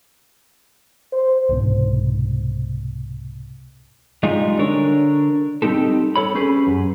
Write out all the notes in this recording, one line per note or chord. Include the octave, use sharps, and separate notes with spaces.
C5
C2 G#2 B2
G3 G#3 D#4 F4 G#4
D3 D4 A#4 C#5
G3 C4 D#4 G4 A4
A4 C#5 B5
C#4 G4 G#4 B4
F#2